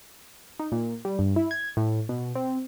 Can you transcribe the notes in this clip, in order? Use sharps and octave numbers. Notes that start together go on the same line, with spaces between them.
D#4
A#2
G3
G2
E4
G#6
A2
B2
C4